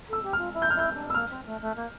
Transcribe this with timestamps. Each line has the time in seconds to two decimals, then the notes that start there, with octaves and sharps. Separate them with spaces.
0.08 A4 E6
0.23 G4
0.33 F4 F6
0.53 E4
0.62 G6
0.70 F6
0.75 E4 G6
0.94 D4
1.10 E6
1.14 A#3 F6
1.29 C4
1.46 A3
1.61 A3
1.75 A#3